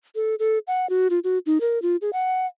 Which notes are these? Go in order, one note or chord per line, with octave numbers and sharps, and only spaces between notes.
A4
A4
F#5
F#4
F4
F#4
D#4
A#4
F4
G#4
F#5